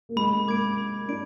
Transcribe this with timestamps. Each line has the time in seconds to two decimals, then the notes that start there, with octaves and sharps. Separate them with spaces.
0.09 A#3
0.16 G#3 B5
0.47 A#3 D6 G#6 D7
0.78 B5
1.08 D4 D7